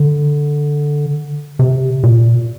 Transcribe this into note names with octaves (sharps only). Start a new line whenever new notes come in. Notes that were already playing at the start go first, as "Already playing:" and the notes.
Already playing: D3
C3
A#2